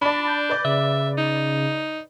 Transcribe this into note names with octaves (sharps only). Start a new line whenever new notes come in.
D4 D5 A5 B5
G6
B4 D5
C#3 E5
D#4